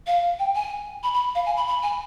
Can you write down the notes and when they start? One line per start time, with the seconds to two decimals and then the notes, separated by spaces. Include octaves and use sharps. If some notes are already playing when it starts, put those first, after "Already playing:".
0.07 F5
0.39 G5
0.55 G#5
1.03 B5
1.14 B5
1.35 F5
1.46 G#5
1.57 B5
1.68 B5
1.83 G#5